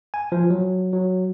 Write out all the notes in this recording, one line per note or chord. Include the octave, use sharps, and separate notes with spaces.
G#5
F3
F#3
F#3